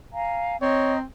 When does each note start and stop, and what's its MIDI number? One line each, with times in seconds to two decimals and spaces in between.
0.12 0.55 77
0.12 0.55 80
0.12 0.55 82
0.61 1.03 60
0.61 0.94 73
0.61 0.98 75
0.61 0.98 82